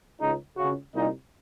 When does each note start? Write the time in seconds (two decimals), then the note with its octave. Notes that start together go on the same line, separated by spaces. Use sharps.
0.21 C#2 C#3 D#4
0.57 C#2 C#3 F#4
0.95 C2 A#2 D#4